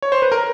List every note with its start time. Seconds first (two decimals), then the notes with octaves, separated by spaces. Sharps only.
0.02 C#5
0.12 C5
0.22 B4
0.32 A#4